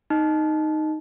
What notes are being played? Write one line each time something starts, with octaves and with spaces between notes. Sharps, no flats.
D#4